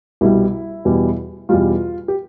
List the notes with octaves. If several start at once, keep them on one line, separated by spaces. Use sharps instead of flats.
C2 B2 G3 E4
E2 B2 G3
E2 B2 G3 F4
G4